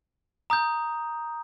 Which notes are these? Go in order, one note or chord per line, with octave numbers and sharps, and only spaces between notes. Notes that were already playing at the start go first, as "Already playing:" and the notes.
A#5 D#6 G6